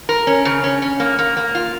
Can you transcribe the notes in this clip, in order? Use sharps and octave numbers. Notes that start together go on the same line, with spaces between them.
A#4
C#4
C#3
C#4
C#4
A#3
A#3
A#3
F4